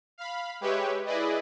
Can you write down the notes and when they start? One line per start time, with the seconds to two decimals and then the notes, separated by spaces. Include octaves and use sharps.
0.18 F5 B5
0.61 G#3 G4 B4 C#5 E5
1.06 E4 G#4 B4 D5 D#5